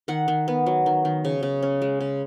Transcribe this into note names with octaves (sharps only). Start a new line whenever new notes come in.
D#3 F#5
D#3
B3
F#3
D#3
D#3
C#3
C#3
C#4
G#3
C#3